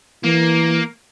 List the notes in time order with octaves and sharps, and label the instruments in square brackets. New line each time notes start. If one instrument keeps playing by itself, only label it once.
[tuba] E3 [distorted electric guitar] A#3